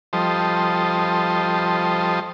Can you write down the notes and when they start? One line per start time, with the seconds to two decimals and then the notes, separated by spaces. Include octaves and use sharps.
0.13 F3 G3 A4 C5 D#5